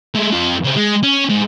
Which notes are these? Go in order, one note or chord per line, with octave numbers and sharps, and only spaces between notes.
G#3 A3
F2 F4
C#3 C4
G#3
C#4
G#2